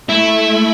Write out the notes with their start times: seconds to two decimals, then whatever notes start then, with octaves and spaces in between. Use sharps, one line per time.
0.09 A3 E4